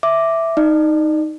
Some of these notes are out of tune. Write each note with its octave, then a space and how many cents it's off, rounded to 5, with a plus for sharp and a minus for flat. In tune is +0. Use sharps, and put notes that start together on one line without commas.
E5 +0 D6 +0
D#4 +0 D5 +35